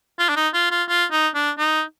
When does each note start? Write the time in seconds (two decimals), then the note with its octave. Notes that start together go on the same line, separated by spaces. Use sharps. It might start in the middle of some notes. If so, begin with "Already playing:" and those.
0.19 F4
0.29 D4
0.36 D#4
0.54 F4
0.71 F4
0.88 F4
1.11 D#4
1.34 D4
1.58 D#4